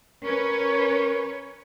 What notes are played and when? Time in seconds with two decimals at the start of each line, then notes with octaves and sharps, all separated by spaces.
0.24 C#4 A#4 B4 C#5